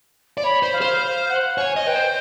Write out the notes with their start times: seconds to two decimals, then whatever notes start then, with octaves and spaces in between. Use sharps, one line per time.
0.38 D5
0.44 C#5 B5
0.63 C5
0.72 F5
0.81 C5
1.01 F5
1.28 F#5
1.57 C#5 G#5
1.76 D#5
1.85 B4 G5
1.95 C5